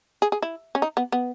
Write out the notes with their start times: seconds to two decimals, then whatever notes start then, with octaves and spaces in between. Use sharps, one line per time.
0.22 G#4
0.32 G#4
0.42 E4
0.75 C#4
0.82 D#4
0.97 B3
1.12 B3